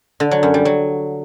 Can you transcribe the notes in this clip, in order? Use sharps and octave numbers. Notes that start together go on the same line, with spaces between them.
D3
F#3
F#2
G3
F#3